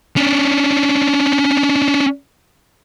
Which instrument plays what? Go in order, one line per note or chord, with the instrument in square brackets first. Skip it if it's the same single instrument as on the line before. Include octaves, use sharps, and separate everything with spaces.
[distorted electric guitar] C#4 D4